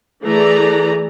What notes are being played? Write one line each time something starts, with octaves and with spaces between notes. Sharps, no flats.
E3 A3 G#4 D5 A#5